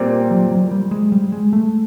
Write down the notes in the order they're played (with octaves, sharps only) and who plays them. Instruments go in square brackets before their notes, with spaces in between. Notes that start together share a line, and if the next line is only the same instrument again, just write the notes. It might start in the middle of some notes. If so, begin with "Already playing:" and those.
Already playing: [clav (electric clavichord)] A#2 G3 C4
[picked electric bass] F#3
F#3
G3
G#3
G3
G#3
A3